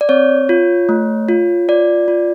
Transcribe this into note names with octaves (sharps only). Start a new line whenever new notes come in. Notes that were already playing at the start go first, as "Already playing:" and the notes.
D5
C4 C#5
F4
A3
F4
F4 D5
F4